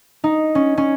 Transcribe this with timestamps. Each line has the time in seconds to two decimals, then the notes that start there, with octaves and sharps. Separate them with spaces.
0.24 D#4
0.55 C#4
0.77 C#4